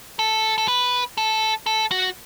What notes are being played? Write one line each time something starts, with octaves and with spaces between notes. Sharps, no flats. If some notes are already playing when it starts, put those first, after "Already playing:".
A4
A4
B4
A4
A4
F#4